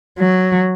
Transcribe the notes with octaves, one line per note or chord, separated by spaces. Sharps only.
F#3